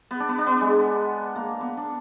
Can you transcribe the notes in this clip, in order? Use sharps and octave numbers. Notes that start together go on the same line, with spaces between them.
B3
D4
B3
D4
B3
G#3
A#3
B3
D4